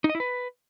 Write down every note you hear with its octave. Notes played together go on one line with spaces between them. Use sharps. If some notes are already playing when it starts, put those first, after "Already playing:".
D#4
D#5
E4
B4